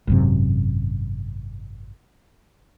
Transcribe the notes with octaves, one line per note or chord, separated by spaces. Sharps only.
G#1 F#2 C3